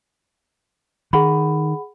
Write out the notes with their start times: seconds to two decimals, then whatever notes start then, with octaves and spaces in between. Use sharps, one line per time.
1.13 D#3 G#4 F#5 B5